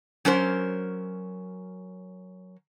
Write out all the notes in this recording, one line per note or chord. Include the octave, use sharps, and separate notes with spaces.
F#3 C#4 A#4 C5